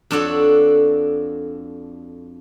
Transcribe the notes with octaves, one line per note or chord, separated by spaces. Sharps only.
F2 D4 F#4 A4 C#5